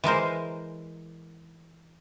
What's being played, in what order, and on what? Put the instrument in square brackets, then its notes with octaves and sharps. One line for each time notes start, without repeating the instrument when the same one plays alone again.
[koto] E3 G#3 A#4 C5